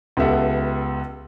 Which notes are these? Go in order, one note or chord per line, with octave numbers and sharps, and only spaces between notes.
C#2 B3 G4 A4 E5 F#5